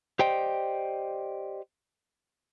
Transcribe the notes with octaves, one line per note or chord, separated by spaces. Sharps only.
G4 C5 D5 D#5 G5